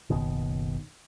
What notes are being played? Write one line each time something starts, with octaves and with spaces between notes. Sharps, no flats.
F#1 C#2 B2 D#3